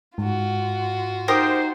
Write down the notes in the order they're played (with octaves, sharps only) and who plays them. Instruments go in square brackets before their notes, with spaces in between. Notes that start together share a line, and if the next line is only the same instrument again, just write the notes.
[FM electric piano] G#2 [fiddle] F4 F#4
[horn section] D#4 C5 [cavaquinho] G4 A#4 D#6